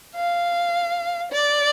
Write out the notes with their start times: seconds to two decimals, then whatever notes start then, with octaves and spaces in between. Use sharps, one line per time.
0.16 F5
1.32 D5